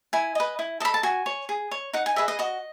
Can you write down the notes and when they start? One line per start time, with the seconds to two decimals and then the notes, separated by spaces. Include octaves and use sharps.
0.13 E4 G#5
0.35 B4 D#5
0.59 E4
0.80 A4 D#5 B5
0.94 A5
1.03 F#4 G#5
1.26 C#5
1.49 G#4
1.71 C#5
1.93 D#4 F#5
2.06 G#5
2.16 G#4 B4 D#5 E5
2.28 D#5
2.39 F#4 D#5